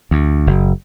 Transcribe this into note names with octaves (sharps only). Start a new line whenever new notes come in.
D2
F#1